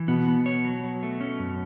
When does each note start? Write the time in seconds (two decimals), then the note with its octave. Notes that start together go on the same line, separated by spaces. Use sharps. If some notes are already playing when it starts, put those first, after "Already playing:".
Already playing: E3
0.08 B2 B3
0.28 B3
0.46 C#5
0.64 F#3
0.84 F#3
1.03 A3
1.21 C#4
1.39 F#2